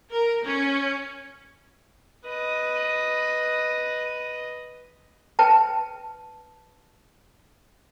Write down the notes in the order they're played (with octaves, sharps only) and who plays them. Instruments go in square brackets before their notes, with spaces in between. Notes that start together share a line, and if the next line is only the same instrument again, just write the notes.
[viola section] A#4
C#4
[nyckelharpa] B4 D#5
[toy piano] B4 G5 A5